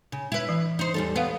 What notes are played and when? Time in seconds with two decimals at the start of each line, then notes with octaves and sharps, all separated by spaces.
0.12 C#3
0.32 E4 B4
0.49 E3
0.79 D#4 C5
0.94 E2 G3 A4
1.16 B3 B4 F5